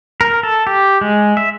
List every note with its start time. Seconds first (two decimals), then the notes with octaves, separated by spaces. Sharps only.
0.21 A#4
0.43 A4
0.67 G4
1.01 G#3
1.37 E5